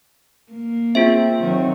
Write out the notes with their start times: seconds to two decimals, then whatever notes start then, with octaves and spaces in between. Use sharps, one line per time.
0.52 A#3
0.95 C4 F4 G#4 E5
1.39 D#3 F#3